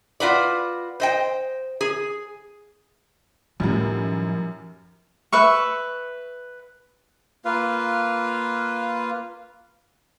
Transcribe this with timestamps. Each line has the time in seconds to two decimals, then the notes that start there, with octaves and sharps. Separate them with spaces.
0.20 F4 F#4 B4 D5
1.00 C5 D#5 G5
1.81 G#4
3.60 F#2 A2 D#3 F3 G3
5.33 B4 E5 C#6
7.45 A#3 F4 B4 F5